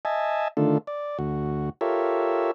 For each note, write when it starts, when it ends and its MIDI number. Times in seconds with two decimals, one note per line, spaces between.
0.05 0.48 75
0.05 0.48 76
0.05 0.48 80
0.05 0.48 81
0.57 0.78 50
0.57 0.78 51
0.57 0.78 57
0.57 0.78 62
0.57 0.78 65
0.57 0.78 69
0.87 1.18 74
1.19 1.70 38
1.19 1.70 66
1.81 2.51 65
1.81 2.51 67
1.81 2.51 69
1.81 2.51 70
1.81 2.51 73
1.81 2.51 76